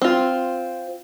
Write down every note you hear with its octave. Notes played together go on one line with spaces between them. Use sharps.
C4 F4